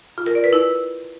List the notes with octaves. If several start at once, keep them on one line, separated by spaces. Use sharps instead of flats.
F4
A#4
D5
B4
E4